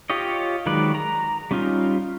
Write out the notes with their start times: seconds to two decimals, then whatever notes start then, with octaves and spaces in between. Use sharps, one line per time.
0.10 F4 G4 C#5 D#5
0.66 D#3 F#3 G#3 B4 D5
0.95 A#5
1.51 G3 C#4 D#4 F4